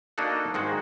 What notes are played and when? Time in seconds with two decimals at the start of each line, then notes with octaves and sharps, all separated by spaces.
0.18 A#3 D4 D#4 F#4 A4 F#5
0.54 G#2 D#3 G#3 F#4